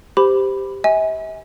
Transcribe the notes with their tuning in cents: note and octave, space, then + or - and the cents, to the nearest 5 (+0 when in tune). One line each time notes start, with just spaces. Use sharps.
G4 +0 C5 -20 B5 +5
E5 -45 G#5 -10